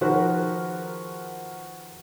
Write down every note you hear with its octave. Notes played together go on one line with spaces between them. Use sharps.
D#3 F3 F#4 G#4 A#4 B4